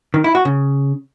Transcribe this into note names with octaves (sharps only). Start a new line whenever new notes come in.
D#3
E4
F#4
C#3